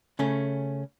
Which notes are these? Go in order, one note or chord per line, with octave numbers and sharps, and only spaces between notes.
C#3 A3 C#4